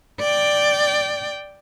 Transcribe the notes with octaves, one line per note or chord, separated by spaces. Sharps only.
D5 G5